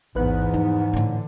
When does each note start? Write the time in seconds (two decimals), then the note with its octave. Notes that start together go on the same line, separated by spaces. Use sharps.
0.16 A1 E2 G#2 B3 B4 F#6
0.54 F3 D#4
0.93 A2 D3 E3 C#4